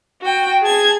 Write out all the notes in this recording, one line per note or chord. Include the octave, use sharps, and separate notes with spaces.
F#4 G5
G#4 A5 G#6